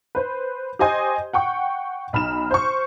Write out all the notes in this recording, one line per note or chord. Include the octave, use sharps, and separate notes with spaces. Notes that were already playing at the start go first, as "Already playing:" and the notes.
B4 C5
G4 C5 D#5 G#5 C6 G6
F#5 G5 C#6
B1 B5 F6 E7
C5 C#6